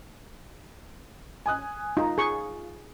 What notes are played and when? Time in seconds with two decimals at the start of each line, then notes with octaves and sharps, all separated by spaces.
1.46 G#5 D#6 F#6
1.97 D#4 F4
2.18 G#4 C#6